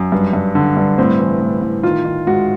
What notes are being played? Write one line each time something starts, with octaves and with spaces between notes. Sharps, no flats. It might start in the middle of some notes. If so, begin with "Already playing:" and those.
Already playing: F#2
G2
G2
D3
G2
A2 C4
E3
A2
A2
D#3 F4
D#3
G#2 F#4